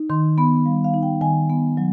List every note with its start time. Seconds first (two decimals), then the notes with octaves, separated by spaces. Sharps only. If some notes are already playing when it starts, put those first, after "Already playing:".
Already playing: D#4
0.10 D#3 C6
0.38 B3 B5
0.66 G3 F5
0.84 F5
0.94 D#4
1.03 G5
1.21 D#3 G#5
1.49 B3
1.77 F#3